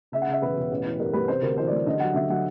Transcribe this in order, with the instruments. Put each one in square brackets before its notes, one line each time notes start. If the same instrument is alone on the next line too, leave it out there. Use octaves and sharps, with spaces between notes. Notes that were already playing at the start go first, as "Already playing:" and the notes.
[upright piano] C#3 E5
F#5
C#3 E5
E1 B4
E1
A1
E3
G2 A#4
G3 B4
C3 C5
D2 A#4
E3 C5
D5
G3
D3 D#5
F#3 F#5
D3 E5
F#3 F#5